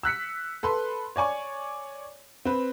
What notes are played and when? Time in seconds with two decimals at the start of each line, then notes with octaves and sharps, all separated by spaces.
0.03 E6 F#6 B6 C#7
0.63 A4 B4 B5 C6
1.16 C#5 D5 G#5 C#6
2.45 C4 B4